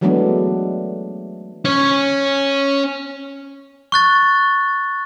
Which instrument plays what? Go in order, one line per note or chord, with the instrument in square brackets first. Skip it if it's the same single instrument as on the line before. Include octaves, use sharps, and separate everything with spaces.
[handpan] E3 F#3 G#3 A3 B3 D4
[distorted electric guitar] C#4 C#5
[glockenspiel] C#6 F#6 A6